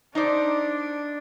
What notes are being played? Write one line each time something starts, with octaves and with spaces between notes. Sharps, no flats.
D4 D#4 C5 D5